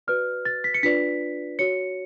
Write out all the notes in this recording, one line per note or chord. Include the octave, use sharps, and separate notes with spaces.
F#4 B4 D5 F6
A6
B6
C#7
D4 F4 B4 D5 B6
F#4 C#5 C#7